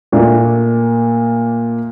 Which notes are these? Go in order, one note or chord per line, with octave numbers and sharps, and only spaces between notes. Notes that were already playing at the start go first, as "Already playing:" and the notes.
A#2 A3 A#3 D4